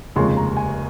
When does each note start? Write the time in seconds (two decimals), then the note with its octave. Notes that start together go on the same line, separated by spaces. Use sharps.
0.16 F1 D#2 C#3 F3 G#3 C6
0.37 A#5
0.57 G#5